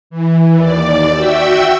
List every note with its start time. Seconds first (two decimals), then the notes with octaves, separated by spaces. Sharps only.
0.10 E3
0.56 D#2 D5
1.12 F#4 E5 G5 E6